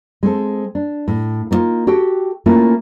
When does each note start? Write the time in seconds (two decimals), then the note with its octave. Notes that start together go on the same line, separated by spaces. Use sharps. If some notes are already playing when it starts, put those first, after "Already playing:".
0.23 G#3 C4 A4
0.75 D4
1.08 A2
1.51 A#3 B3 D#4 F4
1.87 F#4 G4 A4 G5
2.46 A3 A#3 C#4 E4 F4